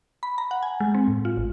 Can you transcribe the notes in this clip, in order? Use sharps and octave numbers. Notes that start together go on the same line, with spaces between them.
B5
A#5
F#5
G#5
G#3
C4
A2
F4
G#1